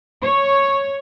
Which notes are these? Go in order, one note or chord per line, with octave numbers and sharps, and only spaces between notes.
C#5